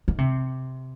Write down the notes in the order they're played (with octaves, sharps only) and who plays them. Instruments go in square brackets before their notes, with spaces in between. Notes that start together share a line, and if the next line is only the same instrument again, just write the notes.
[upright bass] D#3
C3